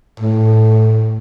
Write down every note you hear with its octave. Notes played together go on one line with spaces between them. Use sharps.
A2